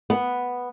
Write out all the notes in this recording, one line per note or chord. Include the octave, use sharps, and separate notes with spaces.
B3